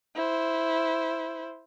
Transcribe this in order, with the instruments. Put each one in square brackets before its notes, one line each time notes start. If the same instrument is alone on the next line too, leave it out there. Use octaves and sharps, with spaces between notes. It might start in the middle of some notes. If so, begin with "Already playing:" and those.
[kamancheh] E4 C5